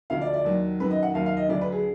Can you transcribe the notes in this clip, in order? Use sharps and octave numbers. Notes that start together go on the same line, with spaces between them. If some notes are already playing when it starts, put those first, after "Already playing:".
D2 D3 F3 F5
D5
D5
D#2 D#3 F#3
F#2 D#3 F#3 B4
D#5
F#5
D#2 D#3 F#3 F5
F5
D#5
D2 D3 F#3 D5
B4
G#4